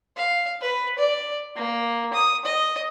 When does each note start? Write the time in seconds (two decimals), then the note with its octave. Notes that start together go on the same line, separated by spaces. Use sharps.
0.17 F5
0.61 B4
0.98 D5
1.56 A#3
2.13 D#6
2.45 D#5